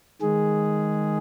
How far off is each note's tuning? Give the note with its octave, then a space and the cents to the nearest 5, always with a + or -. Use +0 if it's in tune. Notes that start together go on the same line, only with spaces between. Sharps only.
D#3 +0 G#3 +0 G#4 +0